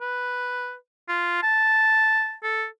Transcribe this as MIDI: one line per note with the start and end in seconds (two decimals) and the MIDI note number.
0.01 0.75 71
1.09 1.42 65
1.43 2.35 81
2.43 2.65 69